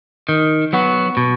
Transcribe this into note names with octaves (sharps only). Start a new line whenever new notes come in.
D#3
F#3 B3 F#4
B2